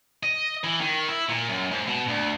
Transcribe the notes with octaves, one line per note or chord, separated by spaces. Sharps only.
D#5
E3
D#3
E4
A#2
F#2
G#2
B2
D2